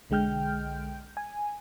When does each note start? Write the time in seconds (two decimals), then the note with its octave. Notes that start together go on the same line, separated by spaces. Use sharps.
0.10 B1 D3 G#3 G5 F6 G6
1.17 G#5